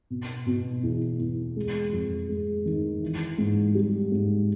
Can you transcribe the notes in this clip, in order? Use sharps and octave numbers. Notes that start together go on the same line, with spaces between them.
B2
B2
E2
E2
G#3
F2
G#3
D#3
E3
G#2
G3
G#2